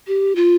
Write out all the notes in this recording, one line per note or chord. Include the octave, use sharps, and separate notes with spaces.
G4
F4